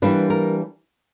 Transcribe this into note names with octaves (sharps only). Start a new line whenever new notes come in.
E3 G3 A#3 D4 B4
A#4